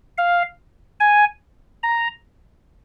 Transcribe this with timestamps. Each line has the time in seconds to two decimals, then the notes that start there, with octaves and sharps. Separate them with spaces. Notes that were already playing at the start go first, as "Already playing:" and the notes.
0.18 F5
1.00 G#5
1.83 A#5